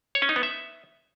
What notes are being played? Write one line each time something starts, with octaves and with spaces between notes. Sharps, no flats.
C#5
C#4
D#4
B3
E5